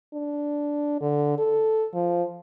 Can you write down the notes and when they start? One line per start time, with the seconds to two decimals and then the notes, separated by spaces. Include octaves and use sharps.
0.13 D4
1.01 D3
1.39 A4
1.94 F3